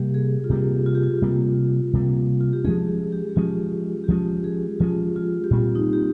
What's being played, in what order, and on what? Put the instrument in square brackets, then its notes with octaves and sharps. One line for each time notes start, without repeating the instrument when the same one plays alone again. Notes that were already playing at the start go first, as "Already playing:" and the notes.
Already playing: [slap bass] C3 G3 A#3 [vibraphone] G4
[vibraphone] G#4
F4
[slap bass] C3 G3 A#3 [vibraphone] G4
[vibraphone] F4
G4
F4
[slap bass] C3 G3 A#3
C3 G3 A#3
[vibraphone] F4
G4
[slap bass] F3 G#3 C#4 [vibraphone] G#4
[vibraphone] G4
G4
[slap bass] F3 G#3 C#4 [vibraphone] F4
[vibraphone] G4
[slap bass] F3 G#3 C#4 [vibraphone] F4
[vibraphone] G#4
[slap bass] F3 G#3 C#4 [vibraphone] F4
[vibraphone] F4
G4
[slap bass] A#2 G3 C4 [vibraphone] F4
[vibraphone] D#4
G4